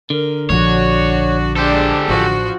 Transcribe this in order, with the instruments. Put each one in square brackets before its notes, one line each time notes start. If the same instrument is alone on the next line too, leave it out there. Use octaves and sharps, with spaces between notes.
[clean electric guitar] D3 [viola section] A#4
[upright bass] A#1 F3 [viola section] D4 F#4 [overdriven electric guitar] C#5
[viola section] G#3 D4 C5 [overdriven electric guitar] G4 A4
[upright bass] A1 [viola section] F3 F#4